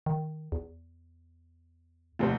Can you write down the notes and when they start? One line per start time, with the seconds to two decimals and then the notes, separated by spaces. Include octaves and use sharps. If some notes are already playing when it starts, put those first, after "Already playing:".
0.06 D#3
0.52 E2
2.19 F1 D#2 C5